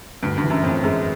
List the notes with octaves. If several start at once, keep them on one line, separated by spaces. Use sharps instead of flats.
D2 G2
G2
E3
F#2
F2 A2
F#2 G#3